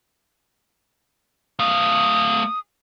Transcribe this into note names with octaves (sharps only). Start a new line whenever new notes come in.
A3 F5 D#6